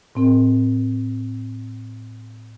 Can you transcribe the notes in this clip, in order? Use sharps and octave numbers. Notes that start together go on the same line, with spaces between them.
A2 C4 A#4